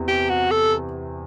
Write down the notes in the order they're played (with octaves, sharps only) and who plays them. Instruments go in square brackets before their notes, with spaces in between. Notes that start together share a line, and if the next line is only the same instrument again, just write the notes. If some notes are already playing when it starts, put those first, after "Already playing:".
Already playing: [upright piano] E2 C3
[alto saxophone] G4
F#4
A4